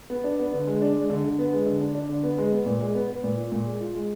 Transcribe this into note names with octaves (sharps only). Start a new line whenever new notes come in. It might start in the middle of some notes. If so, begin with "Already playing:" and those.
B3
D4
B3
D3
G#3
D4
G#3
D3
D3
B3
G#3
D3
D4
D4
D3
B3
G#3
B3
A#2
G#3
B3
B3
A#2
F4
A#2
G#3
F4
G#3